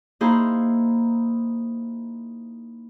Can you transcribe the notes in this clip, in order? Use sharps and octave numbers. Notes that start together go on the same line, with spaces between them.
A#3 D#4 E4 G#4 C5